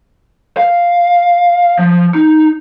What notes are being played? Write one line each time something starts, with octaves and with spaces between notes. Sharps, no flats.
F5
F3
D#4